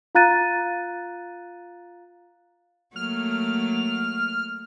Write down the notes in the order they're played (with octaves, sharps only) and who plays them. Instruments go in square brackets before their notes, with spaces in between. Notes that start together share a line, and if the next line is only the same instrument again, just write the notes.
[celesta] F4 F5 A#5 F#6 A6 D#7
[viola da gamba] F#3 A3 A#3 [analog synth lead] F6